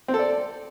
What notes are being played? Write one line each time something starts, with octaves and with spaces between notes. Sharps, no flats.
C4
A4
D5